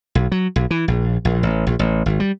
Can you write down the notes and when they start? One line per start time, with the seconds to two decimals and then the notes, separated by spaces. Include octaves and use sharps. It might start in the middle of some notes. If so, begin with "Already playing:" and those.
0.15 B1
0.32 F#3
0.56 B1
0.71 E3
0.88 A#1
1.25 A#1
1.43 A1
1.67 A#1
1.79 A1
2.06 G#1
2.20 G3